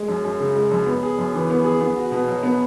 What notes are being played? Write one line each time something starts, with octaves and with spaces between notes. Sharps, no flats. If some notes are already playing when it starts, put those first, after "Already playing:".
Already playing: G#3
F#2
F#2
C#3
G#3
F#2
B3
G#4
F#2
E3
B3
G#4
B3
F#4
B2
F#3
B3